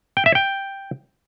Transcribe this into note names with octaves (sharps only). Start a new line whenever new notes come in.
G5
E5
G5